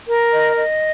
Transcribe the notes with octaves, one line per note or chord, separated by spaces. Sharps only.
A#4
D#5
D#5